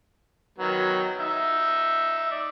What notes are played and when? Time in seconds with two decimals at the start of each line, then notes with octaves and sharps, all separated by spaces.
0.58 D#3 F#3 B3
1.19 D#4 E5
2.31 D5